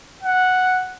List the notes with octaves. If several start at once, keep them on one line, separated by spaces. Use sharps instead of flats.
F#5